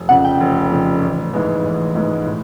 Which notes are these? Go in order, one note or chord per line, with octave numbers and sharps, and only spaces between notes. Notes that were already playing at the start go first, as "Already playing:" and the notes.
Already playing: F1
F2 C#3 F#5
G5
F1
F2 C#3
A1
G#2 E3 G#3 B3
A1
G#2 E3 G#3 B3
A2